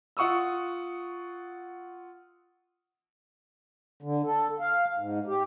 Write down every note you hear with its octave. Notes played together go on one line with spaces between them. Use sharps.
F4 F#5 C#6 D#6 E6
D3
A4
F5
G#2
G4